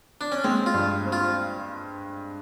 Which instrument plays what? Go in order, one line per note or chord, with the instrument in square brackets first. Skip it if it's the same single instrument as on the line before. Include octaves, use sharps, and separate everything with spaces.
[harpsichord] D4
C#4
[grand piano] G#3 [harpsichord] C4
[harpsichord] F4
[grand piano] G2
C4
[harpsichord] F4